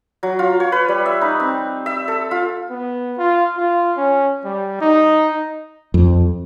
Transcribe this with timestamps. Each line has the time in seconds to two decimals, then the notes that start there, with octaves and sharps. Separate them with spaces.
0.23 F#3
0.39 F4
0.60 C#5
0.72 B4
0.88 G3
1.05 E5
1.21 D#4
1.40 C4
1.86 E5
2.08 A4
2.31 F4
2.70 B3
3.18 F4
3.57 F4
3.97 C#4
4.45 G3
4.81 D#4
5.94 F2